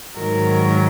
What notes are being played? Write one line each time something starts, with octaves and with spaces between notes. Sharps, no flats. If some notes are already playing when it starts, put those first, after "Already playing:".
G#2 D#3 F#3 A#4